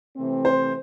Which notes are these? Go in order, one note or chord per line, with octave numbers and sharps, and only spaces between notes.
C3 E3 A3 C4
C5